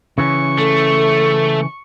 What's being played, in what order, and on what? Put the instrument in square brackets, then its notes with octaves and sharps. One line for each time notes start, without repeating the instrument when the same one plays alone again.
[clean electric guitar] C#3 E3 C#4 [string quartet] C#6
[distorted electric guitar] A3 [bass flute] A4